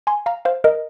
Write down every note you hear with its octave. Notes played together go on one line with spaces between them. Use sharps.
G#5 C6
F5 A#5
C5 F5
A#4 D#5